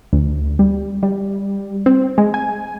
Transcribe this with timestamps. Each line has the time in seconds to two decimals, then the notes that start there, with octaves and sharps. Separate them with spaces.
0.13 D2
0.59 G3
1.03 G3
1.86 C4
2.18 G#3
2.34 G#5